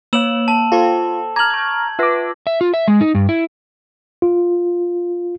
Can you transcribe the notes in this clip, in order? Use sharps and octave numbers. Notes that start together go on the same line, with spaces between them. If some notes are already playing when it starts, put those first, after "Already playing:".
A#3 C#5 F5 E6 E7 F#7
A5
F4 A4 C5 G5
A#5 D6 F6 G#6 F#7
C#6 G6
F4 B4 E5 D6 A#6
E5
F4
E5
G#3
D#4
G2
E4
F4